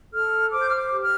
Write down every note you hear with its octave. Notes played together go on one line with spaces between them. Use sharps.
A4 F6
C5 D6
G6
F6
D6
G4
F6